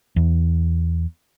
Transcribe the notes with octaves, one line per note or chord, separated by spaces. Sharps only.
E2